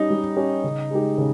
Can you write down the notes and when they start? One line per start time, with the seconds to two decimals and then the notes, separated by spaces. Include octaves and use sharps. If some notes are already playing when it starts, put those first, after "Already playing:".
Already playing: G3 C#4 D#4 G4
0.10 G3
0.36 C#4 G4
0.64 C#3
0.91 G#3 D#4 G4
1.18 C#3